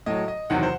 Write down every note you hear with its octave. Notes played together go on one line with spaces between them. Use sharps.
A2 F#3 D#5
D#5
E2 C3 D#3 F#3 F#5
C5